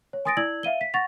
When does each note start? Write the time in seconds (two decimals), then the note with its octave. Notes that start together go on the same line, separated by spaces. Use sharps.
0.13 C#5
0.25 G#5 C6 D#6 A6 A#6 D7
0.37 E4 D5 E6 G#6 F#7
0.63 E5 F5 D#7 G7
0.81 B6
0.94 F#5 C#6 A6 A#6 F7